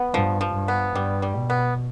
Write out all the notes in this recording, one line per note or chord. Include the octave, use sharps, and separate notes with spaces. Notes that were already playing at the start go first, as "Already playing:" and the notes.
Already playing: B3
G2 F3
F3
G2
B3
G2 G3
G3
B2
B3